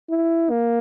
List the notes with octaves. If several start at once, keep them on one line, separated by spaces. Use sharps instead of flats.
E4
A#3